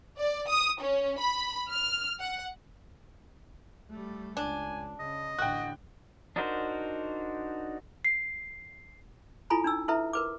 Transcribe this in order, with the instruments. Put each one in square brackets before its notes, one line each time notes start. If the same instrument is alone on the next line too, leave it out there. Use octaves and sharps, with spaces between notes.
[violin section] D5
D#6
C#4
B5
F6
F#5
[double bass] G3 A3
[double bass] C#2 [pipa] D4 [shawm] G#5
[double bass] C#3 [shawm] D#5
[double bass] A1 D3 [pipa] F#4 [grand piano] G5 F#6
[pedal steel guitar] D4 D#4 F#4 A#4 C5
[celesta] C7
[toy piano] E4 F4 A4 G#5 A#5 B5
D4 D#4 E6
E4 A4 B4 E5 A#5
A#4 B4 D6